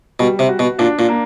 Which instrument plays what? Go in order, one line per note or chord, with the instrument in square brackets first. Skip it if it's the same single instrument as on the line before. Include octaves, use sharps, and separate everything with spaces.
[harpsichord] B2 [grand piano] G3
[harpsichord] C3
[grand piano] F#4
[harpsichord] B2
[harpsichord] A#2 [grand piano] D4
[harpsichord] A#2
[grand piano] A#3